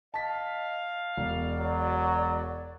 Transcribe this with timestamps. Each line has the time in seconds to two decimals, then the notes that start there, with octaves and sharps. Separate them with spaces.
0.14 D#5 F5 A5 B6
1.17 E1 D5
1.58 F#3